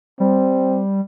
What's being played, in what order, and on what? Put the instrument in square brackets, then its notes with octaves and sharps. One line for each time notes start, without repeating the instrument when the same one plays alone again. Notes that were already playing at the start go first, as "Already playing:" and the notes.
[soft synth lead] G3 [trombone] C4